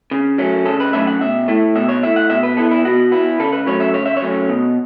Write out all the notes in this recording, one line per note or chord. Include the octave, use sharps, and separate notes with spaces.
C#3
F#3 A3 C#4
C#3 A4
B4
F#3 A3 C#4 E5
F#5
B2 E5
A3 E4
B2 E5
C#5
A3 E4 E5
F#5
B2 E5
B4
B3 E4 A4
E4
B2 F#4
B3 E4
C#3 A4
B4
F#3 A3 C#4 C#5
E5
C#3 C#5
E5
C#5
F#3 A3 C#4
B2